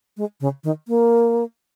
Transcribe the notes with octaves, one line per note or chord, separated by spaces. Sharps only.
G#3
C#3
D#3
A#3